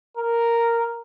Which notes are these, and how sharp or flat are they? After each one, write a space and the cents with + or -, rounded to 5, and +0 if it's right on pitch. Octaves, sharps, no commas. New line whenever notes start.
A#4 -5